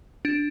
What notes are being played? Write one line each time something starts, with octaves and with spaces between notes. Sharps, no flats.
D4